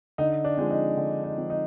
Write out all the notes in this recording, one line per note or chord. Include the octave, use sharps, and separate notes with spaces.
D3 D#4
D4
F3 G#3 C4
D#4
D3
D#4
F3 G#3 C4
D#4